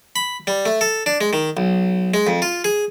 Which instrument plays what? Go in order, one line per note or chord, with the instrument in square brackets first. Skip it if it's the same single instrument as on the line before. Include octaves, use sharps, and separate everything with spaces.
[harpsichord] B5
G3
A3
A4
D4
G#3
D#3
B1
G#3
F2
F4
G#4